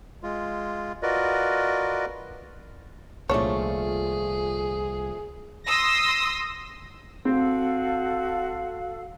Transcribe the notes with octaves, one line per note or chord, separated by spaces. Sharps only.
G#3 F4
F4 F#4 A#4 B4 D5 D#5
C2 A#2 F3 A3 D4 G#4 C#5
C6 D#6 E6 A#6
C4 F#4 A4 F5